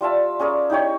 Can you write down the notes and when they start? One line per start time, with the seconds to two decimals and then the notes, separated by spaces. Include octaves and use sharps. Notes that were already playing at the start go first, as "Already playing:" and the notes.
0.01 G3 F4 E5 A5
0.39 C#4 G#4 A#4 D5
0.70 D#4 E4 G4 C#5